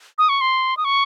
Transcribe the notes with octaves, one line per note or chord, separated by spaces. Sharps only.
D#6
C#6
C6
D#6
C#6